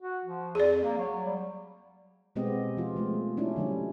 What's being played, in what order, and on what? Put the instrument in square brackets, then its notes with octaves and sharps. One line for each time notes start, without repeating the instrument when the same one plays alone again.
[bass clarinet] F#4
F3
[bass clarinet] F2 [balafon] G#4 D5
[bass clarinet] A#3
F#3
G3
[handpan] B2 G#3 B3 C4 G4 D#5
F3 F4
F3 G#3 A3
F#3 C#4 D4 E4
D3 F3 G3